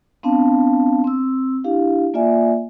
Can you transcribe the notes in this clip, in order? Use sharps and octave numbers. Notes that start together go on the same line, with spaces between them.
B3 C4 D4 F5 A5
C4 E6
D4 E4 G4 F5
A#3 F4 D5 E5 G#5